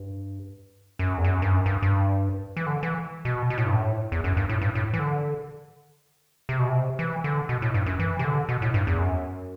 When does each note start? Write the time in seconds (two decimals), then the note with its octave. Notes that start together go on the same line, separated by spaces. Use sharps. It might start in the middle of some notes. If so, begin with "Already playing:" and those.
Already playing: G2
0.99 F#2
1.18 E2
1.24 F#2
1.42 G2
1.49 F#2
1.66 G2
1.82 G2
2.57 E3
2.66 D3
2.83 E3
3.25 B2
3.50 B2
3.58 A2
3.66 G2
3.75 A2
4.12 E2
4.24 F#2
4.37 G2
4.49 A2
4.61 G2
4.75 A2
4.94 E3
4.99 D3
6.49 C3
6.59 B2
6.68 C3
6.99 E3
7.24 D3
7.49 B2
7.62 A2
7.74 G2
7.86 F#2
7.99 E3
8.19 C3
8.25 D3
8.49 B2
8.62 A2
8.74 G2
8.87 E2
8.99 F#2